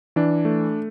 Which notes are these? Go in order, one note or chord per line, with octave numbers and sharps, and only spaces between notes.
E3 D4
A3